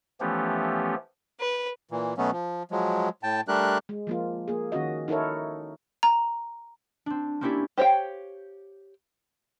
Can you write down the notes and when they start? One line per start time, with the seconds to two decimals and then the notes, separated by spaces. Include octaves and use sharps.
0.20 E3 F3 A3 B3 C#4 G4
1.40 B4
1.91 A#2 E3
2.18 B2 F#3 A3 B3 C#4
2.33 F3
2.71 F3 F#3 G#3
3.23 A2 G5 A5
3.48 G3 A3 D4 G4 A#4 F#6
3.89 G#3
4.07 F3 A#3 F4
4.48 A#3 G#4
4.72 D#3 C#4 F#4 D#5
5.08 D#4 E4 A4 A#4 C#5
6.03 A#5
7.06 C4 D4
7.41 A#3 C4 C#4 E4 G4 D5
7.78 G4 C5 C#5 F5 G5